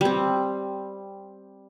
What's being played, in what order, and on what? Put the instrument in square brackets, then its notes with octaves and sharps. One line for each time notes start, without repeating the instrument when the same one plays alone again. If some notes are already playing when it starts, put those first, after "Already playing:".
[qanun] G3 C4